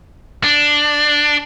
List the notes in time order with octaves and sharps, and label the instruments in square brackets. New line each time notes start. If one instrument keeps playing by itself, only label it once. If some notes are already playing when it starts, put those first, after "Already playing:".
[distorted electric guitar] D4